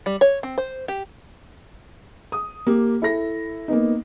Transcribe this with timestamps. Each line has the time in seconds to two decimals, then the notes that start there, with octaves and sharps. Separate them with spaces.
0.06 G3
0.21 C#5
0.43 C4
0.58 C5
0.88 G4
2.32 D#6
2.67 A#3 G4
3.02 E4 A4 A#6
3.68 A#3 B3 D#4